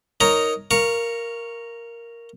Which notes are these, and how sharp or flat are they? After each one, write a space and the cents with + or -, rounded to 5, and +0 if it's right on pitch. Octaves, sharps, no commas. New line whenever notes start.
D#4 +0 A#4 +0 C#5 +10
A#4 +0 F5 -20 C#6 +0